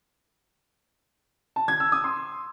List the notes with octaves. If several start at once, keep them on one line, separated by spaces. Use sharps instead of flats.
A5
G#6
E6
D#6
C6